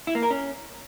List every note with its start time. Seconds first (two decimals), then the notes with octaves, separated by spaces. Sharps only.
0.07 E4
0.15 A#3
0.23 A#4
0.31 C#4